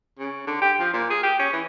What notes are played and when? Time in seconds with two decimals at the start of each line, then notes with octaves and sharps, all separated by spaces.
0.19 C#3
0.47 D3
0.62 G4
0.79 F3
0.94 A#2
1.10 G#4
1.23 G4
1.39 C#4
1.53 E3